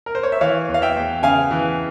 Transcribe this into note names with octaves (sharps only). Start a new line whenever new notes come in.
A#4
C5
C#5
E5
E3 C#5 F5
E2
F5
E5 G5
E2
C#3 F5 G#5
E3